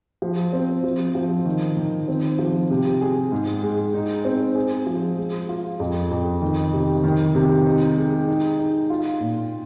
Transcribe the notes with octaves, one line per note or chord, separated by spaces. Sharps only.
F3
C4
F3
F3
D#3
D#3
C4
F3
C3
G#4
G#2
G#3
D#4
C4
G#4
F3
G#3
F4
F2
F2
D#3
C3
D#3
C3
D#4
G#3
D#4
D#4
F4
A#2